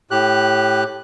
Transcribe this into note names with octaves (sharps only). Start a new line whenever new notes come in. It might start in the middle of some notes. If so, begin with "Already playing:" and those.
A2 G4 F#6